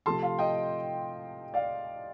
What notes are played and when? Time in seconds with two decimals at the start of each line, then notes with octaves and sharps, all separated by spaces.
0.06 C3 F3 A3 A5 C6
0.22 F5 A5
0.39 D#5 G5
1.54 D5 F5